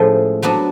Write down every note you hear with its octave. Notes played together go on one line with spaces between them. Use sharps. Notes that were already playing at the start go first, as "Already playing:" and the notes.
Already playing: A2 F3 G#3 C#4
F#3 B3 D4 F#4